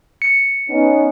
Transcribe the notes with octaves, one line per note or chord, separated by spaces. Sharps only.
C#7
B3 C#4 D#4